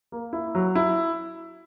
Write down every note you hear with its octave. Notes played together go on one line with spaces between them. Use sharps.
A#3
E4
F#3
E4